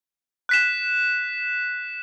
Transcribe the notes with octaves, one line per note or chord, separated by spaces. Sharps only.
F#6 B6 E7